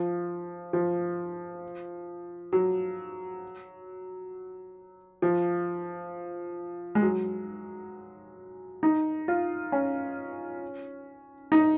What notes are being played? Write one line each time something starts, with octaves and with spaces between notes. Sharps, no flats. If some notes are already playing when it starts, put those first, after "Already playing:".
Already playing: F3
F3
F#3
F3
G#3
F#3
D#4
F4
C#4
D#4